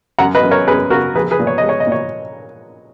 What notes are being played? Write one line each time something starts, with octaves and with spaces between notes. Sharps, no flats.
F#2 F#5 A#5
B4 D#5
F#2
A#4 C#5
F#2 G#4 B4
C#3 F#4 A#4
A#1 G#4 B4
G#4 B4
A#2
C#5
D#5
G#3
C#5
D#5
A#2
C#5